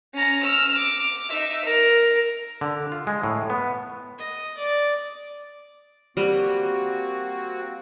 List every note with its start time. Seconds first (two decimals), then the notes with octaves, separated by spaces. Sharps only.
0.14 C#4 A#5
0.43 E6 F6
0.77 D6
1.29 D#4 E5
1.65 A#4
2.61 D3
2.92 F4
3.07 G#3
3.23 A2
3.50 B3
4.19 D#5
4.57 D5
6.17 G3 A#3 C4 F#4